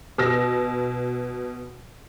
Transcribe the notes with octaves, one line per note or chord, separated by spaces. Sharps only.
B2 E6 A#6